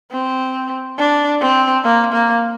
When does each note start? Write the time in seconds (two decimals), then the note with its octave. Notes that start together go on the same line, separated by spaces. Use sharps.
0.12 C4
0.98 D4
1.41 C4
1.84 A#3
2.13 A#3